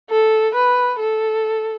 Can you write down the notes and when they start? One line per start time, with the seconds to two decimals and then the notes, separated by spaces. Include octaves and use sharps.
0.10 A4
0.55 B4
1.00 A4